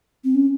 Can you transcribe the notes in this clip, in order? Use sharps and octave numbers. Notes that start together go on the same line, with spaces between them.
C4
C#4